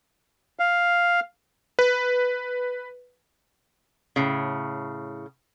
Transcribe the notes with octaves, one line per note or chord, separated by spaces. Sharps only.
F5
B4
A2 C#3